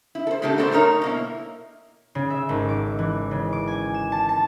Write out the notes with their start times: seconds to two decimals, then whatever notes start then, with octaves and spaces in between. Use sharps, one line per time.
0.15 E4
0.27 A4 C5
0.42 A#2 C#3 A3 D4 G4 A4
0.58 D4 F#4 A4 A#4 C5 D5
0.71 A3 D4 D#4 A#4 C#5
1.02 B2 A#3 E4
2.15 C#3
2.30 E5
2.49 G#1
2.69 D6
2.99 E3
3.31 C#3
3.53 D6
3.67 G#5
3.94 E7
4.12 A5
4.29 A5